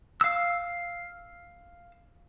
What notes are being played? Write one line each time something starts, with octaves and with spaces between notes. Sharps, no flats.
F5 E6